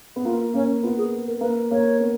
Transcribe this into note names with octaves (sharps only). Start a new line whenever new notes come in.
B3
A#3 F4
A#3 C#4
B3 F4
G#4
A#4
A#3 B4
A#3 C#5
B3